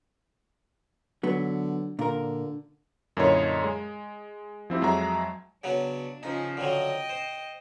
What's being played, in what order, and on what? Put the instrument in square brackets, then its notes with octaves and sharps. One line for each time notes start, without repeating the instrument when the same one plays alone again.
[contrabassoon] D3 [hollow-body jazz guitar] F#3 B3
[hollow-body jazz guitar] A#2 A#4 [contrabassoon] D3
[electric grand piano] F#2 A#2 D3 E4 C#5 D#5
G#3
F3 C4 E4 G4
F2 F#3 G#3 F#4 E5 A#5
[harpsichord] C#3 F#3 B3 [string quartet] D4
[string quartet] C#3 F3 G#4 [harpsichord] D#4
[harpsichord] D3 F3 F#3 [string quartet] D#5 G5
[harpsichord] C5